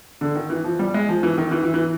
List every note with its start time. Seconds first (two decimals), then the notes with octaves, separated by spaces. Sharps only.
0.21 D3
0.35 D#3
0.50 E3
0.64 F3
0.79 G3
0.94 G#3
1.09 F3
1.23 E3
1.38 D#3
1.51 E3
1.63 E3
1.74 E3